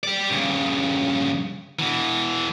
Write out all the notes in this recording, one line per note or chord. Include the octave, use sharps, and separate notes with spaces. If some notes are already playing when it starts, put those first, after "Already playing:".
G4 D5
G2 C#3
B2 E3